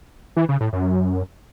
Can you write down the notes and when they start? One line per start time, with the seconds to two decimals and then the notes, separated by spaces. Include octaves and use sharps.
0.36 E3
0.49 C#3
0.60 A2
0.73 F#2